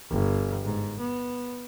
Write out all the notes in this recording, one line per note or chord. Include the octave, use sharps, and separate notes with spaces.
G1
G#2
B3